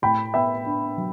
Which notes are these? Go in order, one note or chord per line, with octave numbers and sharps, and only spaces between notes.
A2 G5 B5
B3 E5 G5
D4
F#3